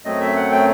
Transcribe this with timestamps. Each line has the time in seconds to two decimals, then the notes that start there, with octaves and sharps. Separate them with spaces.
0.05 F#2 F#3 A3 C4 D#5
0.21 E5
0.36 F#5
0.52 G5